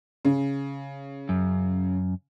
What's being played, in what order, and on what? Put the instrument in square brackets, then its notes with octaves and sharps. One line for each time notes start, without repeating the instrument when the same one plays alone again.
[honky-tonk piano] C#3
[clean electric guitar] F#2